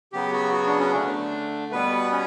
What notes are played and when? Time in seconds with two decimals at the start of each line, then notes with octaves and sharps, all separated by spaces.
0.13 C#3 F#3 B3 G4
0.33 F#4
0.53 F#4
0.67 D4
0.79 C#4
0.93 D3 A3 D4
1.72 B2 G3 B3 B4
2.12 C#4